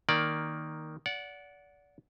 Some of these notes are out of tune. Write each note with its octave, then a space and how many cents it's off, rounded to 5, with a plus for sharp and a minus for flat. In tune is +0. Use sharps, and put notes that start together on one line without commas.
D#3 +0 A#3 +0 D5 +0
D5 -30 F#5 -10